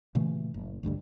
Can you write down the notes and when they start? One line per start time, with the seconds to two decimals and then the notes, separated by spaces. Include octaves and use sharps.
0.15 A#2 C#3 E3 A3
0.54 F#1
0.83 A1 D2 G2 D3